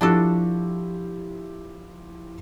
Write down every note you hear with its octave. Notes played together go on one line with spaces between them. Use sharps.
F3 D4 E4 F#4 G4 A4